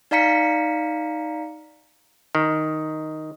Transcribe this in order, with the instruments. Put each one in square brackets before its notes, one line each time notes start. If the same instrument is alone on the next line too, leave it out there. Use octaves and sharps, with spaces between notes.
[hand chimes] D#4 D5 F5 A#5 B6 C#7
[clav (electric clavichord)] D#3